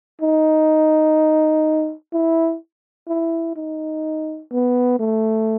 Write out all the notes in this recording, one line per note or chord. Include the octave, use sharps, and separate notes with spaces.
D#4
E4
E4
D#4
B3
A3